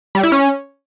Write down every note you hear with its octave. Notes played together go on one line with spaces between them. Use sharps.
G3
E4
C#4